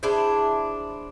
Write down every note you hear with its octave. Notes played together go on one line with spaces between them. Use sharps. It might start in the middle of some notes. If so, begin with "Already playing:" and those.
D4 E4 G#4 C5